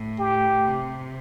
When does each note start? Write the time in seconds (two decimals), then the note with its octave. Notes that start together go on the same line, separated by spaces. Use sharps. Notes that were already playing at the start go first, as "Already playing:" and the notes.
Already playing: A2
0.19 G4
0.67 C3